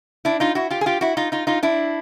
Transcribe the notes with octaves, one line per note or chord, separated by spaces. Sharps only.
D4 E4
D#4 F4
E4 F#4
F4 G4
G#4
F4 G4
E4 F#4
D#4 F4
D#4 F4
D#4 F4
D4 E4